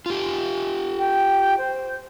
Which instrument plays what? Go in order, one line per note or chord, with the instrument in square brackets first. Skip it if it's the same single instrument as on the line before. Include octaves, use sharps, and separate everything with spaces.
[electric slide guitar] F4 G4
[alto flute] G5
C5